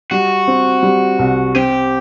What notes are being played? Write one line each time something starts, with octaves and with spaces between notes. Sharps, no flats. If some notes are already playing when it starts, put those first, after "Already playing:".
G3 F#4
C4
G3
C2
C4 G4